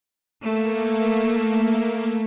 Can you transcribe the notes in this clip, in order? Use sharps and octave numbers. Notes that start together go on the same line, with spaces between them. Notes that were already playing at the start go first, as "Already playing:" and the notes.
A3 A#3